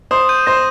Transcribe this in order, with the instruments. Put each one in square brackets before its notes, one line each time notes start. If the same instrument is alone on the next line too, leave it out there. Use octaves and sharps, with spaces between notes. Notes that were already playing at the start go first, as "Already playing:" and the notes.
[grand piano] C5 [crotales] D#6
[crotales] G6 D#7
[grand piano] C5 [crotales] A#6